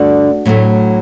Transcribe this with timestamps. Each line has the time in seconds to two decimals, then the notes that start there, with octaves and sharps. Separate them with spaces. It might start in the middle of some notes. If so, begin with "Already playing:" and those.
Already playing: G2 D3 A3 D4 F#4
0.46 A2 F#3 A3